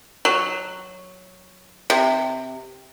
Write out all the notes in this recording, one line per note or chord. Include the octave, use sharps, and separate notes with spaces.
F#3
C3